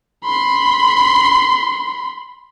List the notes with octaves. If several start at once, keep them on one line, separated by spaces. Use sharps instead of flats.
B5 C6